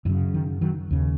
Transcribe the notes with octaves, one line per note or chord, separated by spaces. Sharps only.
F#2 C#3 E3
D#3
D#3 F#3
D#2 C#3